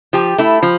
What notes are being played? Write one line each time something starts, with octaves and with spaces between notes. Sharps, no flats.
F3 G4
A3 E4
F3